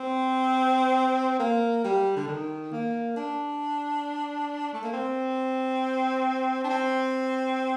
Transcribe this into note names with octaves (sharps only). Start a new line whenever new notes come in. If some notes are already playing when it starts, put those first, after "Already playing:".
Already playing: C4
A#3
G3
D3
D#3
A#3
D4
A3
A#3
C4
D4
C4